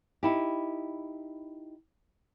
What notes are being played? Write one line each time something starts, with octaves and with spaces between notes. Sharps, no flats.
D#4 E4 G4